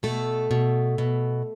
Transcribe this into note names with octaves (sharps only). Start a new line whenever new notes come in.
B2 A3 A4
B2
B2